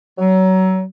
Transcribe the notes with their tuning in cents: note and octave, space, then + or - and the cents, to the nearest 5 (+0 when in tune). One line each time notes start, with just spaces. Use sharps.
F#3 +25